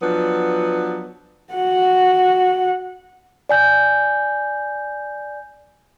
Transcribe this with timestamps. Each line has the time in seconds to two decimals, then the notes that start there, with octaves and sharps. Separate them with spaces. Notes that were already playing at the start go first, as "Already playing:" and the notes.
0.01 F3 F#3 B3 D4 B4
1.53 F#4 F#5
3.49 D5 G#5 G6